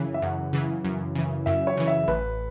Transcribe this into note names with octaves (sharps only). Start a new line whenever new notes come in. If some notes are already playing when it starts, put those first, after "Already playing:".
Already playing: F#2 C#3 E3
E5
F#2 F#5
C#3 E3
F#2
C#3 E3
F#2 E5
C#5
C#3 E3
E5
A1 B4